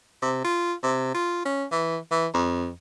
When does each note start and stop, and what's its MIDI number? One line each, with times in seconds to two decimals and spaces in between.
0.22 0.40 48
0.45 0.74 65
0.83 1.15 48
1.15 1.41 65
1.46 1.65 61
1.72 1.98 52
2.11 2.27 52
2.34 2.71 41